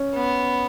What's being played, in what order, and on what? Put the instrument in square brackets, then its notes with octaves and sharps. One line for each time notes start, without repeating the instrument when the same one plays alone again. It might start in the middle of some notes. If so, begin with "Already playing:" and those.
Already playing: [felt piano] C#4
[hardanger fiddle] B3